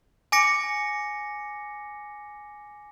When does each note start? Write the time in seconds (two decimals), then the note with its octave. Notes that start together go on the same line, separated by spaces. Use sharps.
0.32 G#5 D6 A#6 C#7